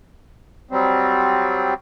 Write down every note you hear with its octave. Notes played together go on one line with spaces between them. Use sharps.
F#3 G3 C4